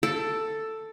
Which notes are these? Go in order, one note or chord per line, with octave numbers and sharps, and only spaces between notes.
A4